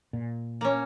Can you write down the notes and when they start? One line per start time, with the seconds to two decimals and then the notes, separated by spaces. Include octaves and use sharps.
0.13 A#2
0.61 A#3 C#4